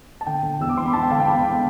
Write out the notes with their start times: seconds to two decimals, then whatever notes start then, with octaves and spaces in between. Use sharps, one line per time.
0.21 A5
0.27 D3 G5
0.43 D3
0.60 E2 E6
0.69 D6
0.77 E2 C6
0.86 B5
0.93 E2 A5
1.03 G5
1.10 D3 F5
1.20 G5
1.27 E2 B5